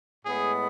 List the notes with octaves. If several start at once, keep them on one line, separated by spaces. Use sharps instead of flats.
A2 G#3 B3 G#4